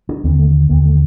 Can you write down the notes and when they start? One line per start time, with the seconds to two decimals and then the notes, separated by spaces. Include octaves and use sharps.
0.09 D4
0.24 D#2 C4
0.27 D3
0.39 A3
0.69 D#2 D3 A#3
0.85 A3